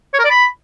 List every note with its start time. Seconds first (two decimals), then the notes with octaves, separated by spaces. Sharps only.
0.13 C#5
0.19 A#4
0.24 D5
0.30 B5